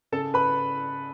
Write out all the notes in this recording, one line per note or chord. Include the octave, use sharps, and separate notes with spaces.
C#3 A4 A5
B4 B5